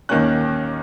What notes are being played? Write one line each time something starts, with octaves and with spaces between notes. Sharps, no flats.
D#2 D#3 A#3 C#4 F#6